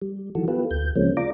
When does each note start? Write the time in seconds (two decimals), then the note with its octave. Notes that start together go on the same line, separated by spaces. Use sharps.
0.02 G3
0.35 D#3 E3 F#3 F#4 A4
0.48 B3 F4 G4 A4 B4
0.71 D2 G6
0.96 C#3 F3 G#3 A#3 C4 C#4
1.17 F4 D5 A#5 D6